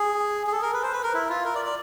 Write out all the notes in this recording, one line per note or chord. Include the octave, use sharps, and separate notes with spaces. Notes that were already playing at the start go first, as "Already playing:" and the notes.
Already playing: G#4
G#4
A4
A#4
B4
C5
B4
A#4
E4
F4
A#4
D5
D5